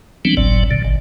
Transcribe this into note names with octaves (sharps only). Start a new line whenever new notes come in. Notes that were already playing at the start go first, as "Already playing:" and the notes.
E3 F#3 G3 B3 C4 D4
G1 C2 A2 F#3 D5
A#2 D3
G#1